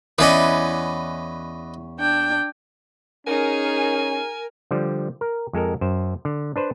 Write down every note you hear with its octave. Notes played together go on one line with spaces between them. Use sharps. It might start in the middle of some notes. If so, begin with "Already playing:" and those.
E2 C#4 B4 D5 D#5
D4 G5
C#4 D#4 G#4 A#4 G#5
D3 F3 G3
A#4
F2 G#3 A4 A#4
F#2 C5
D3
D4 B4 C5